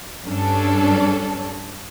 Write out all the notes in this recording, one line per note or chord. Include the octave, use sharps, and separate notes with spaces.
G2 C#4 D4 A4